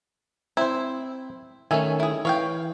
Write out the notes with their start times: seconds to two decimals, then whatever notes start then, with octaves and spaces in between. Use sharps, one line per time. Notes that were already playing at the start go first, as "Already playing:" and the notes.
0.57 C4 E4 C5
1.71 D#3 A3 C#4 E5 G#5
2.00 E4 G#4
2.25 E3 C#5 F5 G5